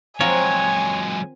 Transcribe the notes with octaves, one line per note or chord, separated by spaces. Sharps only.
F3 F#3 G#3 C4 A#4 C#5 G#5